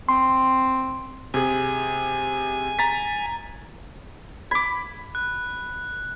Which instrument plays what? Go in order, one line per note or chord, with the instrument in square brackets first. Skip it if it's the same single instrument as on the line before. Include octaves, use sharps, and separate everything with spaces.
[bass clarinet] C4 [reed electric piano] C6
[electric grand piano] C3 G#4 [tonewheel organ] G#5
[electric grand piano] A#5 A6 B6
[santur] B5 [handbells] D6 G#6
[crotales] F#6